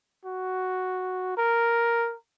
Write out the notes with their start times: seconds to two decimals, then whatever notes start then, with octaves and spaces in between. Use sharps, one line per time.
0.25 F#4
1.38 A#4